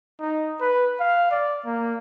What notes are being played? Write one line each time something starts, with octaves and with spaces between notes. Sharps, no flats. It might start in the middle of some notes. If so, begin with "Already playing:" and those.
D#4
B4
F5
D5
A#3